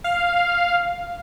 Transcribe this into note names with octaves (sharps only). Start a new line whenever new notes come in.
F5